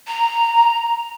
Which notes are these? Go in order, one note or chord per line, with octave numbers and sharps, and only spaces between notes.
A#5